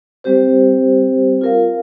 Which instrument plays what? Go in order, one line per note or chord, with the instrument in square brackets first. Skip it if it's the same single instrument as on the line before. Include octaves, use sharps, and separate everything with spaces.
[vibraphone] G3 C4 G4 C5
F4 A#4 F5